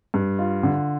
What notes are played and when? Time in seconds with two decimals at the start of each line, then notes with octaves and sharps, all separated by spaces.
0.14 G2
0.39 F4
0.63 D3